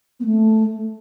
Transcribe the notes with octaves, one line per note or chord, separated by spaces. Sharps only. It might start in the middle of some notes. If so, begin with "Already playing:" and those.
B3
A3